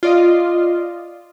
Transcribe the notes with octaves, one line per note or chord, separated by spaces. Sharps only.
F4 D5 D#5